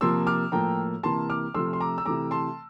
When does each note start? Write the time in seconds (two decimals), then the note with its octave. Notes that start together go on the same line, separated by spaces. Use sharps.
0.01 C3 F3 A#3 C6 E6
0.27 D6 F6
0.52 A2 F3 A#3 G5 A#5
1.03 C3 E3 A#3 A5 C6
1.30 D6 F6
1.54 C3 F3 A3 C6 E6
1.73 C6
1.81 A#5 D6
1.98 E6
2.05 C3 E3 A3 A#5 D6
2.31 A5 C6